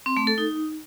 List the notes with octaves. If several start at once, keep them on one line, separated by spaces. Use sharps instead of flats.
C4
A3
A4
D#4